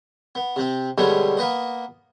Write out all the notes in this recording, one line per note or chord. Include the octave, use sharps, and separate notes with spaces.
B3
C3 C4
B2 D3 G3 G#3 B3 C#4
A#3 B3 B4 D#5